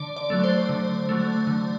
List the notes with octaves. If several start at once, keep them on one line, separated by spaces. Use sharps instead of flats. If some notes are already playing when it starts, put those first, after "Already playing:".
Already playing: D3 D5
D5
F#3 A3
C5
D3
F#3 A3
D3